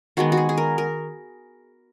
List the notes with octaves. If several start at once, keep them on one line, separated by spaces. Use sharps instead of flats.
D#3 G#3 B3 F#4
F#4
G#4
G#4
A#4
A#4